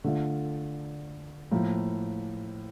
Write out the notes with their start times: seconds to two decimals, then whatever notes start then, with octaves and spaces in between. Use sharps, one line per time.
0.04 D3 A3 D4 F4
1.51 A2 F3 A#3